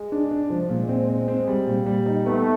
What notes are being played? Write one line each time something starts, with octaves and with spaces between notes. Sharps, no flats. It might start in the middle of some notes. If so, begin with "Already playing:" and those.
Already playing: G#3
D4
D4
F3
A#2 G#3
C4
C4
C4
G3
A#2
G3
D#4
A3 B3